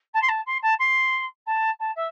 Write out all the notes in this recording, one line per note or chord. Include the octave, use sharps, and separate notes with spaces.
A5
C6
A5
C6
A5
C6
A5
A5
E5